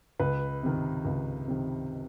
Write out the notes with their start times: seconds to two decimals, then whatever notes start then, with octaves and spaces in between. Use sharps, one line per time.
0.20 C#2 B4
0.63 C3 D#3
1.05 C#2
1.48 C3 D#3